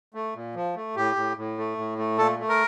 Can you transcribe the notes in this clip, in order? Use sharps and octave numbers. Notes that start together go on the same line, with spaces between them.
A3
A#2
F3
A3
A2 G4
A2
A2
A3
A2
A3
A#2 A4
A3
A#4